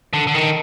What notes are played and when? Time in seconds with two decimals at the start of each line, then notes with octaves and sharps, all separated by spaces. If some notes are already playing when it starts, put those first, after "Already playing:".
0.13 D3
0.27 D3
0.35 D#3